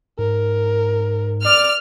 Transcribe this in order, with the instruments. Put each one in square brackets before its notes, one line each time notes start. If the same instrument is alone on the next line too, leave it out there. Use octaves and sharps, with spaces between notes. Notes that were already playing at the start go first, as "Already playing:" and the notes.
[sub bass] G#2 [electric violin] A#4
[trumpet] D5 [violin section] F6